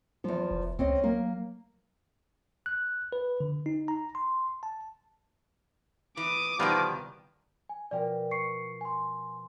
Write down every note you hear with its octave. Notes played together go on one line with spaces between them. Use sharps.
E2 F3 F#3
F1
C#2 C4 C#4 D#5
F#3 A#3
F#6
B4
D3
D#4
A#5
C6
A5
E3 D6 D#6
E2 B2 D#3 F3 G3 B3 F5
G#5
B2 F3 A#4 D5 G5
C#6 C7 C#7
G#5 C6